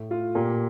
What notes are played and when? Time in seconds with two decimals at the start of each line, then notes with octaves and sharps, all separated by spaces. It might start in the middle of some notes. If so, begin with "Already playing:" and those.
Already playing: A2
0.11 A3 F4
0.35 A#2 G4